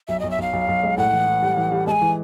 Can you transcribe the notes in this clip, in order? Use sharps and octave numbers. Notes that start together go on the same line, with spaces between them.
B1 E5
B1 D#5
E5
B1 F5
B1
B1
G#3
A2 F#5
E3
E3
G3
E3
G3
G#3 G#5 A5
E3